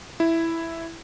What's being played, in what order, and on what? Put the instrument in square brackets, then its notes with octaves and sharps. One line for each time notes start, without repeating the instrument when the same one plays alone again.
[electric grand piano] E4